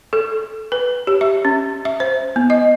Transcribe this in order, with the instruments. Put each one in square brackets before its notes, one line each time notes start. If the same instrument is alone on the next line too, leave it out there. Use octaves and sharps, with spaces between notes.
[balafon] A4
B4
G4
E5
C#4
E5
C5
B3
D#5